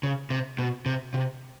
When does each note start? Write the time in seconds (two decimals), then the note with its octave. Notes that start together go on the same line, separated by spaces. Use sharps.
0.03 C#3
0.30 C3
0.59 B2
0.86 C3
1.14 C3